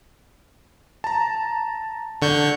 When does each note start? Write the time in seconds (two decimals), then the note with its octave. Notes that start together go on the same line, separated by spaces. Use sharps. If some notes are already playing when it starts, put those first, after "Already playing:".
1.04 A5 A#5
2.22 D3 C#6 G6